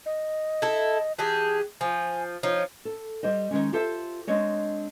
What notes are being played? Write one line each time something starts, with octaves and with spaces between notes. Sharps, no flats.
D#5
E4 A4
E3 G4 G#4 A5
F3 G#5
F3 D#4 C#5
A4
G3 G4 C5 D#5
D#3 F3 G#3 C#4
F4 G4 A4 C5 E5
G#3 C4 D4 C#5 D#5